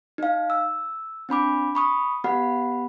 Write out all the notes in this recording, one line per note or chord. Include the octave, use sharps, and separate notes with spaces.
D#4 F5
E6
C4 D4 B5 D6
B5 C#6 D#6
B3 G4 F#5 B5